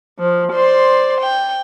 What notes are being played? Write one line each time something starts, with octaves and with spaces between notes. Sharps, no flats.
F3
C5 D5 C6
G5